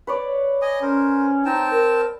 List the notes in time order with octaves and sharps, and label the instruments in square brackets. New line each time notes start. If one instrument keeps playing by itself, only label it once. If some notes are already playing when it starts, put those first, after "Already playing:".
[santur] B4 C#5 D5
[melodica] D#5 G#5 D#6
[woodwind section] C#4 [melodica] A#4 C5
[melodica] C4 G5 A5 [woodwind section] D#4
[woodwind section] A#4